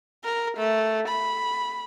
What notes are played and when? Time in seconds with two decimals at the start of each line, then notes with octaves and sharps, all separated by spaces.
0.24 A#4
0.57 A3
1.08 B5